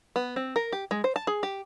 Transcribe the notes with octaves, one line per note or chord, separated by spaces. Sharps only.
B3
C4
A#4
G4
G#3
C5
A5
G#4
G4